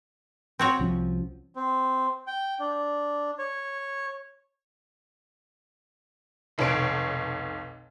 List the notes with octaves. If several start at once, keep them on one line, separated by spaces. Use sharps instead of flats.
C4 F#4 C#5
C2 F3 C#4
C4
G5
D4
C#5
F1 B1 D#3 C#5 D7